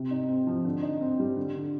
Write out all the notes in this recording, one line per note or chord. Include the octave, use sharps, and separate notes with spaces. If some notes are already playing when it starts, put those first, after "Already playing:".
Already playing: C3
D#4
C4
F3
D3
D#4
C4
G3
D3
D3